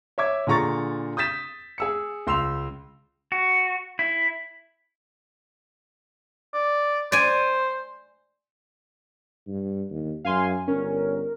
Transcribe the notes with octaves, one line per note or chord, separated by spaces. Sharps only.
C#5 E5 D6 G#6
A#2 D3 G#4 A#5 C#6 A6
D#6 G6 A6 B6 E7
G#4 E6 C#7
C#2 C6 E6 F7
F#4
E4
D5
C5 D5 G#5
G2
D#2
F#2 F5 G#5 C6
G1 C#4 A#4